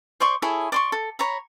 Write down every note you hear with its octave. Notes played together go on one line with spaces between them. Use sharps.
C5 D5 C6 C#6
E4 G#4 A4 C#5
D5 C6 C#6
A4
C#5 A#5 B5